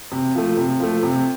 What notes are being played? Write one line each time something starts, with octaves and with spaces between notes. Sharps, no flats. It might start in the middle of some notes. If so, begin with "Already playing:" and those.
C3
F3 A3
C3
F3 A3
C3